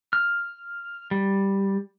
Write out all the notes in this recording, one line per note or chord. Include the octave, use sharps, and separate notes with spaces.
F6
G3